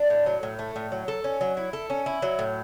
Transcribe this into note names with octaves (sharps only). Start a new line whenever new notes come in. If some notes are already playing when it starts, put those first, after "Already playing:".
Already playing: D4
A2
F#3
A2
A3
A2
F#3
A4
C#4
F#3
E4
A4
C#4
E4
F#3
A2